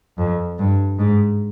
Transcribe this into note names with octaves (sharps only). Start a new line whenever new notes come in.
F2
G2
G#2